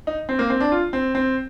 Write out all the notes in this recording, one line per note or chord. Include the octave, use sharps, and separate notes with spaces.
D#4
C4
A#3
C4
D4
F4
C4
C4